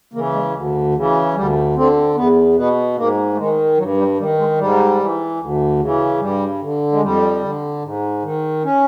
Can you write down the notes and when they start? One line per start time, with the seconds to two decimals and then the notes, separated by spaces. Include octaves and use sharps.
0.14 C#3 E3 A#3
0.33 G#3
0.54 D2
0.95 C#3 E3
1.34 D2 G3
1.75 D3 C4
2.15 E2 B3
2.56 B2 B3
2.96 G#2 A#3
3.33 A3
3.37 D#3 G#3
3.77 G2 F#3
3.97 G3
4.18 D#3 G3
4.38 G#3
4.58 G#2 G3
4.99 E3
5.40 D2
5.80 C#3 E3
6.20 G2 G3
6.61 D3
6.92 G#3
7.02 F2 G3
7.43 D3
7.83 G#2
8.22 D#3
8.64 C#4